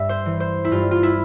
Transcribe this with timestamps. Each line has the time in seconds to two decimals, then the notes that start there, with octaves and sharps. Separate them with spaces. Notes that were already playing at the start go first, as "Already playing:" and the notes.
Already playing: G2 E5
0.09 C5
0.26 E3
0.40 C5
0.64 E4
0.71 G2 F4
0.91 F4
1.03 E4